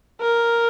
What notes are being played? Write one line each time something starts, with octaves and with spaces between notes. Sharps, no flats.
A#4